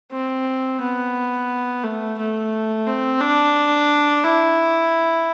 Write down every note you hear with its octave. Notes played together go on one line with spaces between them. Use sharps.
C4
B3
A3
A3
C4
D4
E4